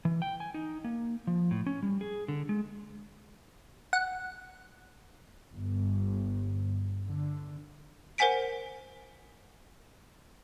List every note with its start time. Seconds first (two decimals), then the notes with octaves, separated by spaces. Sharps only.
0.05 E3
0.22 G5
0.40 G#5
0.54 D#4
0.84 A#3
1.27 F3
1.51 A2
1.66 C#4
1.82 G3
2.01 G#4
2.28 D3
2.49 G#3
3.93 F#5
5.52 G1
7.05 D3
8.18 A#4 C5 F#5 G#5 B6 D7